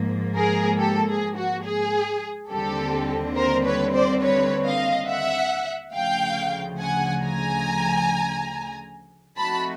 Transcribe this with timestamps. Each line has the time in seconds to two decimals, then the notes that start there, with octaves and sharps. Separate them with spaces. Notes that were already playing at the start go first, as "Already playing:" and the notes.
Already playing: G#2 F3 A#3
0.36 G#4 A#4
0.78 G4 A4
1.07 G#4
1.36 F#4
1.64 G#4
2.50 D#2 D3 G3 C4 G4 A4
3.36 A#4 C5
3.65 B4 C#5
3.93 C5 D5
4.21 B4 C#5
4.64 D#5 F5
5.08 E5 F#5
5.94 D2 C#3 F3 F5 G5
6.79 F#5 G#5
7.21 G#5 A#5
9.36 F3 A3 C4 D#4 F#4 A5 B5